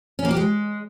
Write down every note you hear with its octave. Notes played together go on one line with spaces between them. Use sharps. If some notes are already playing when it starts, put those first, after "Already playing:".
C#4
A#3
G4
G#3